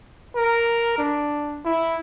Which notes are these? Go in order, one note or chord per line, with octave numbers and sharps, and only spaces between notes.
A#4
D4
E4